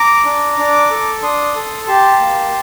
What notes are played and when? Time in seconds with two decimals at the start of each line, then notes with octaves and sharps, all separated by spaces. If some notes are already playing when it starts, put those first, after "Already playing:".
Already playing: A#5 D6
0.25 D4
0.58 D4
0.90 A4
1.22 D4 C6 D#6
1.55 A4
1.87 G4 A5 C6
2.20 A#3